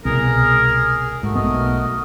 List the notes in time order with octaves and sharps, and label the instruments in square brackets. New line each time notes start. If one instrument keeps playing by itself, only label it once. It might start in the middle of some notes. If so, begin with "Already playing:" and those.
[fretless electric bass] C2 B2 [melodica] G#4 [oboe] A#4
[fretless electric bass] G#2 [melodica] A3 F#4 A#4
[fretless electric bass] B1 B3 [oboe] D#5